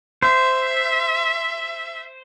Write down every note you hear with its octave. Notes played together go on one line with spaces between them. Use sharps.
C5 E5